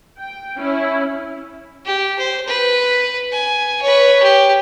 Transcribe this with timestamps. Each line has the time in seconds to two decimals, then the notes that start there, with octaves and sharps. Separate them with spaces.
0.19 G5
0.58 C#4 E4
1.85 G4
2.18 C5
2.47 B4
3.32 G#5
3.82 B4 C#5
4.23 G4